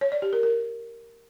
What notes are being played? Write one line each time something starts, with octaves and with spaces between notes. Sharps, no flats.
C#5
D5
G4
A#4
A#4